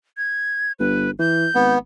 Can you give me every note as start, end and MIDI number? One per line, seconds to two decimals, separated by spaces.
0.17 0.72 92
0.79 1.09 31
0.79 1.11 71
1.19 1.47 52
1.19 1.73 91
1.55 1.76 32
1.55 1.78 59